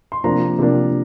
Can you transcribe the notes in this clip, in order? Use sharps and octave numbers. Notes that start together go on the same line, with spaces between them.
C6
C3 F3 A#3 D4 A#5
C3 F3 A#3 D4